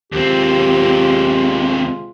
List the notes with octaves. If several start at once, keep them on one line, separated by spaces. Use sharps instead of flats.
D#2 C3 G#3 C4 F4 G4